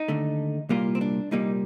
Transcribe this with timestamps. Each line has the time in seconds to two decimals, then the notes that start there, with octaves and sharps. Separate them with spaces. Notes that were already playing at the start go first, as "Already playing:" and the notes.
Already playing: D#4
0.08 D#2 D3 A3
0.69 C2 A#2 G3 A#3 F4
0.95 C4
1.01 D4
1.31 C2 A#2 G3 A#3 D#4